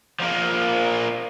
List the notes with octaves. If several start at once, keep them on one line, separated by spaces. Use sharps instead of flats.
F3 A#3